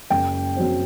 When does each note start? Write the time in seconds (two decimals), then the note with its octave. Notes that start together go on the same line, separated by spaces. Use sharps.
0.10 F#1 G5
0.56 F#2 F#3 C4